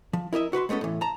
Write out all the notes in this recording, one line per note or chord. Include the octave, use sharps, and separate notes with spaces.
F3
E4 A#4 D#5 E5
F#4 B4 E5 C6
G#3 A3 B3 C#4 A4
A2 E3
A5 A#5